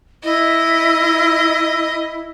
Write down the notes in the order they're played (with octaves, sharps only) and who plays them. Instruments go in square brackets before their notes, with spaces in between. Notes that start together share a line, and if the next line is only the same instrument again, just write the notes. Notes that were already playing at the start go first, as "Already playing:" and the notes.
[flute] E4 [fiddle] D#5